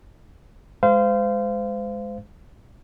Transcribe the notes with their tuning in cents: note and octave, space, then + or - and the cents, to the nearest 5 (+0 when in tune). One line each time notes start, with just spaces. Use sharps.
G#3 +0 C5 -30 F5 -20